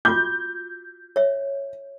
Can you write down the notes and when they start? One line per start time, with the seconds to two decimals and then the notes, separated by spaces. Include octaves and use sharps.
0.05 F4 F#4 D6 G6
1.16 C#5 E5